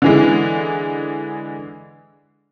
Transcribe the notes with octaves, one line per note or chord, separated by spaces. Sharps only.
D3 E3 G#3